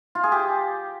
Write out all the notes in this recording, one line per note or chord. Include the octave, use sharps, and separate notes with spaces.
F4
G#4
G4